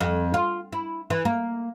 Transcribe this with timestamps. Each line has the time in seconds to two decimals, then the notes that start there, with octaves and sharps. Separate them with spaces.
0.01 F2
0.34 F4
0.72 E4
1.10 E3
1.25 A#3